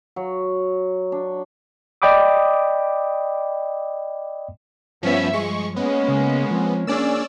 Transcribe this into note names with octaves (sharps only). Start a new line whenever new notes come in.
F#3
D4
D5 D#5 G5 B5 D6 D#6
G2 F3 B3 C#4 E5
F3 G#3 C#6
G#3 A#3 B3 C#4
C#3
F3 C4
A#3 C#4 D4 G#4 D5 E6